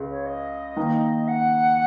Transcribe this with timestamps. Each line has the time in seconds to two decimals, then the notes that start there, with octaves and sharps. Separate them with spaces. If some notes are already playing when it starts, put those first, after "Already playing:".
Already playing: C#2
0.10 C#5
0.26 D#5
0.76 D#3 A#3 D#4
1.28 F#5